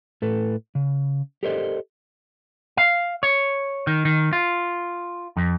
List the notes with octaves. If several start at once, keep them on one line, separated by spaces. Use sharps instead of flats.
A2 A4 B4
C#3
G4 A4 A#4 C5 D5 D#5
F5
C#5
D#3
D#3
F4
F2